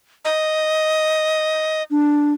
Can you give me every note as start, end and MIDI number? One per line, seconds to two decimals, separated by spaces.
0.25 1.83 75
1.91 2.33 62